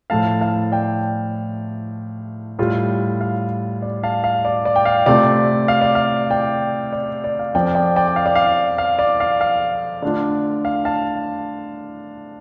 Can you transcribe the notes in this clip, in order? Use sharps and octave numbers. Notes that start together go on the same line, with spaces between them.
A2 F3 A3 F5 A5
F5 A5
D5 G5
A2 G3 F4
F5
D5
F5 A5
F5
D5
D5
G5
F5
C3 A3 F4 D5
F5
D5
F5
D5 G5
D5
D5
F5
F2 F3 C4 D5 G5
D5 G5
D5 G5
F5
D5
F5
F5
D5
F5
F5
D3 A3 D4 F4 D5
F5
F5 A5